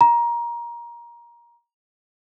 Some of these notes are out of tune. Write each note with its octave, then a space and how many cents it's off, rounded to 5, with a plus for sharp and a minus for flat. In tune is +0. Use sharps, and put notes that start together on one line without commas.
A#5 +20